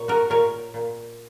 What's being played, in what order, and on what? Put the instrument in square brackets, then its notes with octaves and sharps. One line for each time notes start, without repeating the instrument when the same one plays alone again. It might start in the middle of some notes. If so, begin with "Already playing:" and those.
Already playing: [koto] A#2 C#5
F#4 A#4
A#2 A#4 C#5
A#2